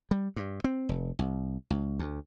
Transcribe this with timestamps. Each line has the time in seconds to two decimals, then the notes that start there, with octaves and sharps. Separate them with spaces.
0.11 G3
0.36 G2
0.64 C4
0.89 F1
1.19 C2
1.70 C#2
1.99 D2